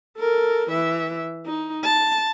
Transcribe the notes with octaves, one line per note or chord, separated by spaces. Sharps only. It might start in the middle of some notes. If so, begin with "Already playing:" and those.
A4 A#4
E3 E5
D#4
A5